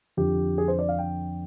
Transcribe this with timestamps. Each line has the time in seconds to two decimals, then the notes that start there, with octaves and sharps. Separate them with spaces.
0.17 F2 D3 G4
0.58 G#4
0.68 C5
0.79 D5
0.89 F5
0.98 G5